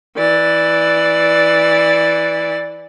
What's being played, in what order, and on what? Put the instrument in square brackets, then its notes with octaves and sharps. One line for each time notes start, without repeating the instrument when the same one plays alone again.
[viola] E3 D5